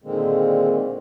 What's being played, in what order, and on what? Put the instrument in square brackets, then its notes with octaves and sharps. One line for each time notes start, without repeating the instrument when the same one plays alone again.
[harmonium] A#2 D3 D#3 G#3 A#3 C4